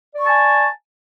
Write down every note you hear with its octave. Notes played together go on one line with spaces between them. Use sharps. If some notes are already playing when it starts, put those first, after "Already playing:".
D5 G#5 A5 C#6